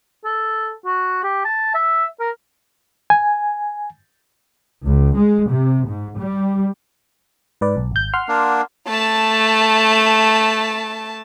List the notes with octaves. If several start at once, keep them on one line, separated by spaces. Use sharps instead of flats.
A4
F#4
G4
A5
E5
A#4
G#5
C#2
G#3
C3
G#2
G3
G#2 B4 D5
B1
G#1 G6
F#5 C6 F6
A#3 D4
A3 A5